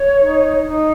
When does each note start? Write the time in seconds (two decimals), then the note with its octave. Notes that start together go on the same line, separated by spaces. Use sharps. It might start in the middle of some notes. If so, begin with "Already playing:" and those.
Already playing: C#5
0.20 D#4
0.66 D#4